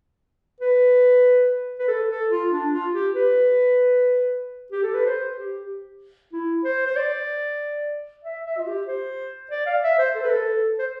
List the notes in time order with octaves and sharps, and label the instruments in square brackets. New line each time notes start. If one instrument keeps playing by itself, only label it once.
[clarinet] B4
B4
A4
A4
F4
D4
F4
G4
B4
G4
A4
B4
C5
G4
E4
C5
C5
D5
E5
E5
F4
G4
C5
D5
F5
E5
C5
A4
B4
A4
C5